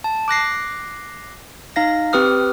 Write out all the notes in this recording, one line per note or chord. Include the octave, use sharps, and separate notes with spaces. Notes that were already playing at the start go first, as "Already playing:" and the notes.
A5
D6 F#6 A#6 C7
D#4 F5 A#6
C4 G4 B4 D#6 F6